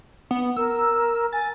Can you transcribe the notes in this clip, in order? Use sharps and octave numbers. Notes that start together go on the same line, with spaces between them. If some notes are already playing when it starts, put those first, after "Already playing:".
B3
A#4 E6
G#5 A6